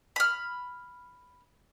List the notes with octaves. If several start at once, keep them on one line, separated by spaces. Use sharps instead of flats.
B5 F6